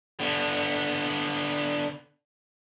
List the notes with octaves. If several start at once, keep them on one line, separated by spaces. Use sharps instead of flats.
D3 B3